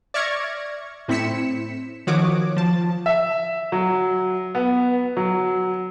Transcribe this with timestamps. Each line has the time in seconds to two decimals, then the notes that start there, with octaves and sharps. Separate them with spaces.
0.14 D5 E5 C#6 F6 G#6 A#6
1.08 A2 C4 E4 B6 C#7 E7
2.07 D#3 F3 F#4 C#5 D6 D#6
2.56 F3 A5
3.06 E5
3.72 F#3
4.55 B3
5.17 F#3